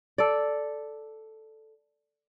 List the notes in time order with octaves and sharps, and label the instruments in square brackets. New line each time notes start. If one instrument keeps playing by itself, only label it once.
[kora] A4 D5